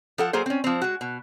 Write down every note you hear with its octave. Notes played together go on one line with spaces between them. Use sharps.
F3 A4 F#5
F#3 A#3 G#4 C5
C4 C#4
F3 C4
G#3 F#4
B2